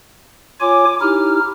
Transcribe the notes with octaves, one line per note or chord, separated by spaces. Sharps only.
F4 C#5 G#5 D6
D#4 E4 G4 F6